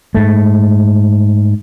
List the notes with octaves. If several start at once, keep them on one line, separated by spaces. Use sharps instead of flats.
G#2 A3